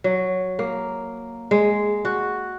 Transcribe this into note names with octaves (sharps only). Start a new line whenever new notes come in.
F#3
A#3
G#3
F#4